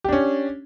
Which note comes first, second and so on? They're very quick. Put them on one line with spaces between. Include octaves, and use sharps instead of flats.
G4 D4 C#4